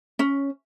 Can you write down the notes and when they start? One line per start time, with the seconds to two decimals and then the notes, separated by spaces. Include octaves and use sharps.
0.19 C#4